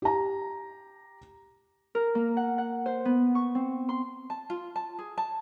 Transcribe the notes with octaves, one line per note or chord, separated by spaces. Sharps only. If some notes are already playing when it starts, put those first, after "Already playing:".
G4 A#5
A#4
A#3
F#5
F#5
C5
B3
C#6
C4
C6
A5
F4
A5
G#4
A5